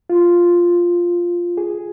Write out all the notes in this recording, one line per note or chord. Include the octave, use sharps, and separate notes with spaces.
F4
G#4